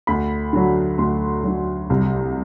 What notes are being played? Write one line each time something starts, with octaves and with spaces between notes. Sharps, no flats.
D2 B5
D3 F#3
D2 C6
D3 F#3
C2